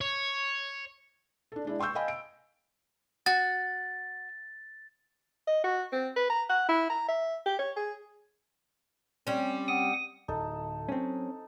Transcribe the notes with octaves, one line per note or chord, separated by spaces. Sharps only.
C#5
D4 A4
G#3 D4 E4
G5 C6 C#6 E6 G6
D#5 F5 G5 G#5 B5
D7
F#4 A6
D#5
F#4
C4
B4
A#5
F#5
E4
A#5
E5
G4
C#5
G#4
G3 C4 C#4 G5
F#5 D#6 D#7
D1 D#4 A4
F#3 C4 C#4